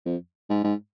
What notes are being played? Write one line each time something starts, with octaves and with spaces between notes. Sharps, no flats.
F2
G#2
G#2